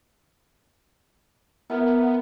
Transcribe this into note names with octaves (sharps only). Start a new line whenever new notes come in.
B3 E4 A#4 A#5